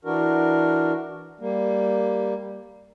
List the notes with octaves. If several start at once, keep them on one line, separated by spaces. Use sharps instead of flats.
E3 D4 F#4 A#4
G3 A#3